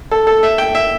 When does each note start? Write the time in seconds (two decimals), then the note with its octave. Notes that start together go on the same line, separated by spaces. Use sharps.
0.11 A4
0.27 A4
0.43 E5
0.58 G5
0.75 E5